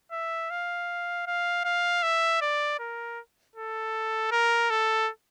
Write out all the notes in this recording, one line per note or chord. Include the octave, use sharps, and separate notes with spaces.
E5
F5
F5
F5
E5
D5
A#4
A4
A#4
A4